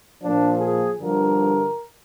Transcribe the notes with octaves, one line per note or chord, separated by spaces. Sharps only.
A#2 F3 D4
G#4
G2 D3 F3 A#4